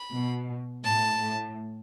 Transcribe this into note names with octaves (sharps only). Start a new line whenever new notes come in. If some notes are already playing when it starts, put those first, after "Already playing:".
Already playing: B5
B2
A2 A5
A2